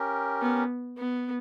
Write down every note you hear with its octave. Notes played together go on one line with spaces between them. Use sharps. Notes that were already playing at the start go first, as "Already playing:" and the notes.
Already playing: C#4 G4 A#4
B3
B3